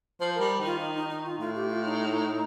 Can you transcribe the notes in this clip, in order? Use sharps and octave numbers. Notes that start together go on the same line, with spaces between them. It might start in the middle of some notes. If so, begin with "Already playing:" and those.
F3 C5
G3 A#4
D#3
F4
D#4
D#4
D#4
F4
A2 F4
G4
F4
D#4